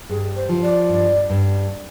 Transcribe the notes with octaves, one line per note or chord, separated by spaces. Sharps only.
G2 G#4
C5
F3
D5
G2
G2